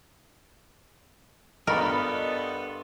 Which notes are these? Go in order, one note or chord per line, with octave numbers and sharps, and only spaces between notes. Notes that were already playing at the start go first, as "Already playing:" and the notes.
G2 B3 F4 A4 A#4 D#5 B5 C#6